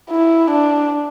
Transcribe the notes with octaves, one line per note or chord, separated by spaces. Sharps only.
E4
D4